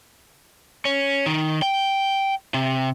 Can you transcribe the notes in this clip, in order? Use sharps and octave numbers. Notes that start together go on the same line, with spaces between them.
C#4
D#3
G5
C3